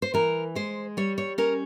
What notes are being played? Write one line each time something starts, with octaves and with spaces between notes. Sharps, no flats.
C5
E3 A#4
G#3 C5
G3 C#5
C#5
C#4 A#4